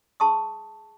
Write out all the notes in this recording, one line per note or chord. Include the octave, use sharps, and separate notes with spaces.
G#4 A5 C6 C#6 D#6